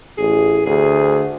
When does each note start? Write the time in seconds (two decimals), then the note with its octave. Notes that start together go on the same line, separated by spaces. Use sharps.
0.18 A1 G#4
0.66 D2 G#4